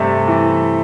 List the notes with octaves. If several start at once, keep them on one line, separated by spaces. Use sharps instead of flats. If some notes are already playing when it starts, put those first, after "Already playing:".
Already playing: G2 C3 A3 A4
E3